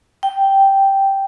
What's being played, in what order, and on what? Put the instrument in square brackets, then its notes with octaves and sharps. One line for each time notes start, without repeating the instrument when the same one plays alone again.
[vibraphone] G5